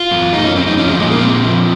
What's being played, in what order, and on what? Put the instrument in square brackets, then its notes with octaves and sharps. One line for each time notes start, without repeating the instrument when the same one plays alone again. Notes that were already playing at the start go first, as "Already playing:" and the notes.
Already playing: [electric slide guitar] F4
F#2
F#2 D#4
C#4
F#2 C4
D#4
F3 C#4
G#3
A#2 G#3
A#3
A#2 C4
F3